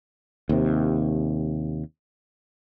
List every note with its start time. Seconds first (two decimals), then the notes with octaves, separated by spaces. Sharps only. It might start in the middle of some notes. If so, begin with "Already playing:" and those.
0.49 D#2 C3